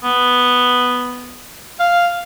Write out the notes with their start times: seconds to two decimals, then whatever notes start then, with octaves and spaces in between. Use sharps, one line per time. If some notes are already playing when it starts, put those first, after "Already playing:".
0.04 B3
1.80 F5